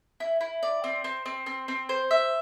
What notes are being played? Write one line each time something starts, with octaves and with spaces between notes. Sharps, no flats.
E4
E4
D5
C4
C4
C4
C4
C4
C5
E5